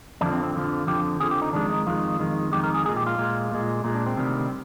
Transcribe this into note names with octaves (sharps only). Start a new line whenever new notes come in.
F2 D3 F3 D4
C4
C4
F2 D3 F3
F2 D3 F3 G4
F2 D3 F3 G#4
G4
D#4
F2 D#3 G#3 D4
D#4
F2 D#3 G#3 F4
F2 D#3 G#3
F2 D#3 G#3 G4
A#4
G#4
A#2 G#3 G#4
G4
F4
A#2 G#3
A#2 G#3
A#2 G#3
D4
C4
D2 C3 D#3 G3
C4